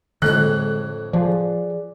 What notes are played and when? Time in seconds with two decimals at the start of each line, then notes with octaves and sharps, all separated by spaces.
0.22 F2 A2 D3 G#3 D4 F#6
1.13 F3 G#4 D5